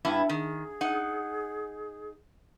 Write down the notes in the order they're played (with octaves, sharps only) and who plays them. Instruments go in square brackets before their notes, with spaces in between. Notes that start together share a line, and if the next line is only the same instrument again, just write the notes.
[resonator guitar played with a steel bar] G2 B3 E4
[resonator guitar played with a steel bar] D#3 [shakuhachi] G#4
[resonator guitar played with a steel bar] D#4 F#5